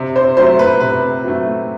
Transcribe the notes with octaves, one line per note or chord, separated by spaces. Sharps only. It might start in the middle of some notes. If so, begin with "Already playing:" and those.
Already playing: C3
C5
F#3 A3 C5
B4
C3 B4
F#3 A3